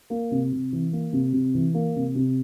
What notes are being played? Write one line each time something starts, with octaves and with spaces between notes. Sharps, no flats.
A#3
C3
C3
E3
A#3
C3
C3
E3
A#3
C3
C3